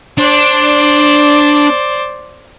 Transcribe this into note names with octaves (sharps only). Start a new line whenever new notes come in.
D4 C5 D5